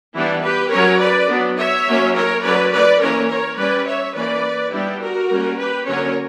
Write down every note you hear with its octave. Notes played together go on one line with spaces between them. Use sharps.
E3 G3 B3 D4 E4
G4 B4
F#3 C#4 A#4 C#5
B4 D5
F#3 B3 D4
C#5 E5
F#3 A#3 C#4
A#4 C#5
F#3 C#4 B4 D5
B4 D5
E3 A#3 C#4 A#4 C#5
A#4 C#5
G3 C#4 B4 D5
C#5 E5
E3 A#3 C#4 B4 D5
G3 B3 D4 E4 G4
F#4 A#4
G3 A#3 C#4
G4 B4
D3 F#3 A#3 C#4 A#4 C#5